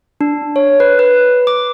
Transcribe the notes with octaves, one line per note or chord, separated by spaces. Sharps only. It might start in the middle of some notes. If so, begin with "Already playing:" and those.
D4
C#5
B4
B4
D6